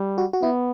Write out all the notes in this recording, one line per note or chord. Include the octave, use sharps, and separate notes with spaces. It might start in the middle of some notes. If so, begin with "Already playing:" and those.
Already playing: G3
F#4
F#4
B3 E4